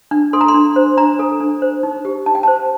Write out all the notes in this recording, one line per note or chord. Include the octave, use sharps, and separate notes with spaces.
D4
A4 C6
A#5
C6
D4
C5
D4 A#5
A4
D4
C5
D#4
G4
D#4 A5
G5
C5 A5